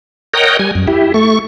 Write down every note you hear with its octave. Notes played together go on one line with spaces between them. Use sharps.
A#4 C#5 D#5 F#5 G5
G3 G#5
F#2
E4 G4
A3 C#6